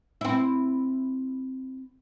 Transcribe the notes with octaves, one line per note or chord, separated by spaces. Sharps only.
C4 E4